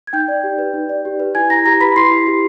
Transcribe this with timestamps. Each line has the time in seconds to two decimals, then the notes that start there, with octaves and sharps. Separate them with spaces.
0.07 G#6
0.13 D#4 G5 G6
0.28 D5
0.43 G4
0.59 B4
0.74 D#4
0.89 D5
1.05 G4
1.20 B4
1.35 E4 G#5 G#6
1.50 E4 A#5 A#6
1.66 G4 A#5 A#6
1.80 B4 B5 B6
1.96 E4 C6 C7
2.11 E4
2.27 G4